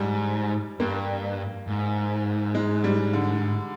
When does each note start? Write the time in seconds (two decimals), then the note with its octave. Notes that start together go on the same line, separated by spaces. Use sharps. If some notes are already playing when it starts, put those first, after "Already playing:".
Already playing: G#2 G3
0.80 G2 A#3
1.67 G#2
2.55 G#3
2.84 G3
3.13 D3